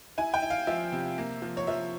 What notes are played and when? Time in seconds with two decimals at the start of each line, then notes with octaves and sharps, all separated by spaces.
0.18 E4 G#5
0.34 G5
0.42 E4
0.50 F5
0.67 F3 E5
0.92 C3
1.18 A#3
1.42 F3
1.57 C#5
1.67 F3 E5